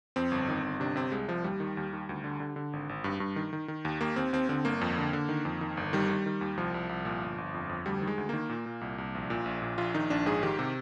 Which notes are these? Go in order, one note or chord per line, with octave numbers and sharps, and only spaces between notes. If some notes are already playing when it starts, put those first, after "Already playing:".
F2 C4
G1
D#3
G1
C3 D4
C3 C4
C2 G#3
C2 F3
D#2 G3
D#3
D#2
D#3
D2
D3
D3
D3
G#1
G#1
G2
G2
D#3
D#3
D#3
D#2
D#2 A#3
D#2 C4
D#2 C4
D3 C4
G1 A#3
F2
D3
D3
D#3
F2
D#3
G1
D#3 G3
D#3
D#3
D#2
C2 F3
C2
C2
A#2
G1
G1
F2
F2
D2 G3
D#3
G#3
D2
D#3 A#3
A#2
A#2
C2
C2
A#1
A#2
A#1
A#2
A#1 F4
D#3 D#4
A#1 D4
G#2 G#4
D#3 G4
C3